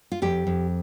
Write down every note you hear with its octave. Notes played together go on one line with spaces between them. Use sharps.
F4
F2 G4
F2